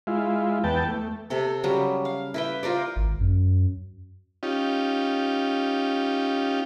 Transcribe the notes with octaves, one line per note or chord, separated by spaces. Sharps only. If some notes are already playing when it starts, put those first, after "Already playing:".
G#3 E4 F4
E2 B3 G5 A5
A3
C3 A4
C#3 F#3 G3
F5
E4 B4 G5
F4 A#4 C5 D5
G#1
F#2
C#4 D#4 F4 G4